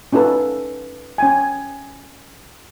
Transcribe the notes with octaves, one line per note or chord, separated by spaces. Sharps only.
C#4 D#4 F4 A4 B4
C#4 G5 G#5